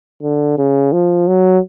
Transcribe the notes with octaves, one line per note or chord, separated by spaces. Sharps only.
D3
C#3
F3
F#3